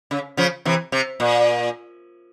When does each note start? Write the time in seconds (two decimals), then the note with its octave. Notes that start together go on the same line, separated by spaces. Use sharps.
0.11 C#3
0.37 C#3 F3
0.65 C3 E3
0.92 C3
1.20 A#2